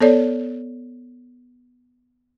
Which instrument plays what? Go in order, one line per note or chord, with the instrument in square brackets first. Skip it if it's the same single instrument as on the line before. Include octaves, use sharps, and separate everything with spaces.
[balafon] B3 A4 C#5 D5